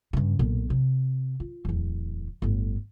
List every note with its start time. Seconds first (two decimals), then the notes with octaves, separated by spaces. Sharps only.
0.13 G2 C#3
0.39 B1 A#2
0.70 C3
1.40 F4
1.65 D1 E2
2.42 G1 A2